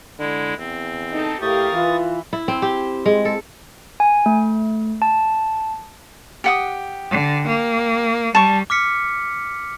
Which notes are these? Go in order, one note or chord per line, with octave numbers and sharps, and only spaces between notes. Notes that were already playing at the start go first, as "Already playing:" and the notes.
D3 G#3 E4
E2 C4
D#4 A4 D#5
A2 G4 A#4 F5 C#6 D#6 A6
E3 F4
E4
C4
G4
G#3
A4
G#5
A3
A5
G4 F#5 D#6
D3
A#3
G3 A5 C#6
D6 F6 B6 C#7